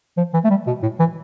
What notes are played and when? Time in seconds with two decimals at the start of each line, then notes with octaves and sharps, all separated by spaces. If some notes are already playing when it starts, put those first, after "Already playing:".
0.17 F3
0.34 E3
0.44 A3
0.50 G3
0.67 B2
0.83 A2
0.99 E3